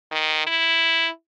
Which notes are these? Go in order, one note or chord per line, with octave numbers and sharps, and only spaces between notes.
D#3
E4